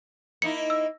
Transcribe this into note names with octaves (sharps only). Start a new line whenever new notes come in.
A#3 D#4 E4 C#7
E6